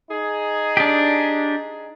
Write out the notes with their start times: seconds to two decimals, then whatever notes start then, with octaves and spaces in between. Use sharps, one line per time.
0.11 D#4 G#4
0.77 D4 G4